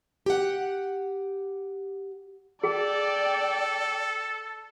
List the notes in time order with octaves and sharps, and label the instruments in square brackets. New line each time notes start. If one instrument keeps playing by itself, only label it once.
[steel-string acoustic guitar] G4 F#5
[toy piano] G#4 [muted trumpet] A4 [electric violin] D5 G5